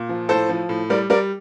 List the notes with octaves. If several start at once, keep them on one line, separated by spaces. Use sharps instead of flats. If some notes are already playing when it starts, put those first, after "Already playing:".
Already playing: A#2
F3
A2 A4 C5
F3
A2
G3 A#4 D5
G3 A#4 D5